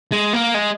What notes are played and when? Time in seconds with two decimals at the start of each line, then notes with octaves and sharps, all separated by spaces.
0.12 G#3
0.33 A#3
0.54 G#3